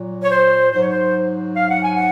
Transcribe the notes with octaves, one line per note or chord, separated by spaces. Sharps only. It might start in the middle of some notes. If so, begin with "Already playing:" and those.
Already playing: A#2 F#3
C#5
C5
G#2 F#3 C5
C#5
C5
F5
F#5
G#5
F#5